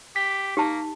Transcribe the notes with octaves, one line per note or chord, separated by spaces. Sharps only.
G4 B6
A#3 D#4 G4 A5